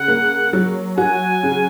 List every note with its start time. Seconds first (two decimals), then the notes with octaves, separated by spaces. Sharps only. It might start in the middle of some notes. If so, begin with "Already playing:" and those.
Already playing: C#3 F#5
0.08 A#3
0.53 F#3
0.97 F#4 G#5
1.43 C#3